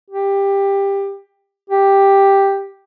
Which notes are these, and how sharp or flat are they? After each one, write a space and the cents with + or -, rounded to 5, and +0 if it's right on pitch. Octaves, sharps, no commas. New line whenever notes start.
G4 +15
G4 +5